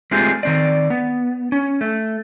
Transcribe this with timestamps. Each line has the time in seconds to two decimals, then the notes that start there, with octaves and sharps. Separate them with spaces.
0.11 G#3 A3 C4 F4 G4 G#4
0.43 D#3 C4 D5
0.90 B3
1.52 C#4
1.81 A3